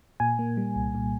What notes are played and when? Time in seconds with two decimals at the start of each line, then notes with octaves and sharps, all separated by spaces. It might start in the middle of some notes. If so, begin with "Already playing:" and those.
0.20 A#2 G#5
0.39 A#3
0.57 G3
0.76 C2
0.95 A#2